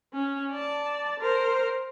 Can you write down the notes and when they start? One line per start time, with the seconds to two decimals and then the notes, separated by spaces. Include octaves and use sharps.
0.13 C#4
0.52 D5 A5
1.20 A#4 C5